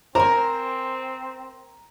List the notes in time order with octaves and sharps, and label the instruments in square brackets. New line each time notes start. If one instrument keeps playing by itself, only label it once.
[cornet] C4 [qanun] A#4 G#5 [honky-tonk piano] C5 [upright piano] A#5